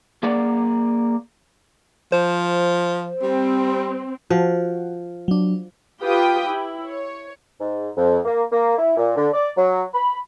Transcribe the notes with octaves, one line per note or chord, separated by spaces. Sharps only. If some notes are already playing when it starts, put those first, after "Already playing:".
A#3 G#4 A#4 D5 F#5
F3 C5
G3 C4
F3 F#4
F#3 D4
F4 G4 B4 G5 D#6
E4
C#5
G#2
F2
A#3
A#3
E4
A#2
D3
D5
F#3
B5